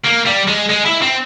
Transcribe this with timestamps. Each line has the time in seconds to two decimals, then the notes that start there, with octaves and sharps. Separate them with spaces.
0.05 A#3
0.26 G3
0.48 G#3
0.70 G#3
0.86 E4
1.02 C4